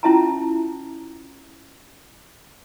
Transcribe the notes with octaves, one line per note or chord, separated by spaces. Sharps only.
C#4 E4 F4 E5 A5 A#5